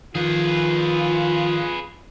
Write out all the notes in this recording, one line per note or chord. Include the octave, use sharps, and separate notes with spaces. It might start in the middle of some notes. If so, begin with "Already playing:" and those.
D#3 F3 F4 G#4 B4